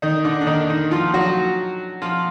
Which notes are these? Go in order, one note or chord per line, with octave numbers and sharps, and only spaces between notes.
D#3 D#4
D3 D4
D4
D#3 D#4
D#3 D#4
F3 F4
F#3 F#4
F3 F4